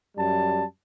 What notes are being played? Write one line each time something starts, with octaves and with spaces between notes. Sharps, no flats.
F#2 G3 A5